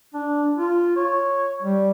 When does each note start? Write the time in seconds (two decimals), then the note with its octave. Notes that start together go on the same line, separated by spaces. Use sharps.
0.14 D4
0.57 F4
0.96 C#5
1.62 G3